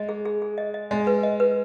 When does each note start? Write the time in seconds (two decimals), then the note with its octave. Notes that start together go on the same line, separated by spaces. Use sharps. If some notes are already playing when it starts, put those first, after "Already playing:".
Already playing: G#3 D#5
0.09 G#4
0.25 G#4
0.42 G#4
0.58 D#5
0.74 D#5
0.91 G#3 D#5
1.07 B4
1.23 D#5
1.40 B4